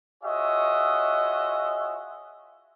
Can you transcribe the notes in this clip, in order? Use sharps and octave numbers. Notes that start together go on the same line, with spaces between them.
F4 F#4 G#4 C#5 D#5 E5